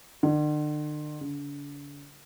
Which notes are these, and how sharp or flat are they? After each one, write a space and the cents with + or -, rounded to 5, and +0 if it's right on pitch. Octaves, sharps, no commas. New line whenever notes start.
D3 +40
D3 -40